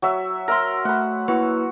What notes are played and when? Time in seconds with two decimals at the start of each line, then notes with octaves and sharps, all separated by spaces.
0.02 F#3 E5
0.48 A#4 E5 C6 A#6
0.85 A3 F#5 B5
1.28 A#3 E4 F#4 B4